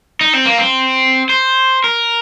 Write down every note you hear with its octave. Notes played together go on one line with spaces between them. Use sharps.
D#4
C4
A#3
C4
C5
A#4